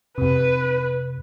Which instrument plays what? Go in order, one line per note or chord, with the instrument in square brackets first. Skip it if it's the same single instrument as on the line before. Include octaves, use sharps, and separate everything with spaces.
[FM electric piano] F2 C3 [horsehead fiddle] B4